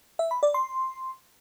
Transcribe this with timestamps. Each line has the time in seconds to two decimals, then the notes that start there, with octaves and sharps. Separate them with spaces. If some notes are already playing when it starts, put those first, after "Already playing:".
0.19 E5
0.31 B5
0.43 D5
0.54 C6